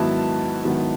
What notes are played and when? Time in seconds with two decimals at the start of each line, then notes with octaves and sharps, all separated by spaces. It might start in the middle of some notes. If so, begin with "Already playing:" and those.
Already playing: G#2 D#3 F#3 B3 E4 A5
0.64 G#2 D#3 F#3 B3 E4